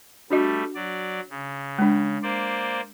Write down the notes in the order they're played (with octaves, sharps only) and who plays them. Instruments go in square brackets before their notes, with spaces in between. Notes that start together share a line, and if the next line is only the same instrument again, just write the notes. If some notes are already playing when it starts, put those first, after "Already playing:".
[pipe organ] G3 A3 [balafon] D4 F#4 D#5
[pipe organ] F#3 D5
C#3
[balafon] G#3 D4
[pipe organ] A#3 C5 D5